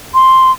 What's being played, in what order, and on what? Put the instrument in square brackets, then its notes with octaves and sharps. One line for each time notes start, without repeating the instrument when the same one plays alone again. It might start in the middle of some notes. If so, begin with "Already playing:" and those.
[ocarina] C6